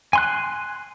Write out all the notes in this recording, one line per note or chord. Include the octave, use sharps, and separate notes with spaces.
G#5 C6 F#6